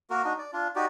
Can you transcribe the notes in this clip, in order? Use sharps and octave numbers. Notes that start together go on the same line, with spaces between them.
A#3 F#4 A#4
D4 D#4 F#4
D5
D4 F4
D#4 F#4 G4 D5